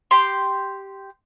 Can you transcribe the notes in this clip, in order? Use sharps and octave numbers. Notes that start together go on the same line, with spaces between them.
G4 C6